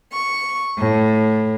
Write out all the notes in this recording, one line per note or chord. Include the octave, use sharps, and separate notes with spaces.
C#6
A2